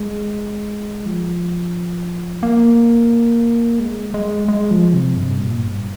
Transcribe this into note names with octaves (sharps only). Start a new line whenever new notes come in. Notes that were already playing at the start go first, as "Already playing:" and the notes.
Already playing: G#3
F3
A#3
G#3
G#3
G#3
F3
C3
G2
A#2
G2